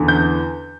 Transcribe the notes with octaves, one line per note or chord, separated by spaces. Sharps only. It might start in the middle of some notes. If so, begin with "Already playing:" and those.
Already playing: E2 D3
G6